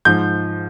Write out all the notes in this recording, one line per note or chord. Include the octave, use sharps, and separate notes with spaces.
G#2 F3 G6